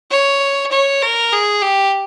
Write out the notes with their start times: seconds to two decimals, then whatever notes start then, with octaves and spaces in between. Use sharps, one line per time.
0.11 C#5
0.72 C#5
1.02 A#4
1.33 G#4
1.62 G4